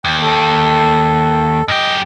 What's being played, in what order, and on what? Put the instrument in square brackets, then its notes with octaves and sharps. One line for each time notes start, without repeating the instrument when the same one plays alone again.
[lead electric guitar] D#2 [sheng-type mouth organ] G5
[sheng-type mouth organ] A4
[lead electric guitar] F#2 G4 [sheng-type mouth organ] D#5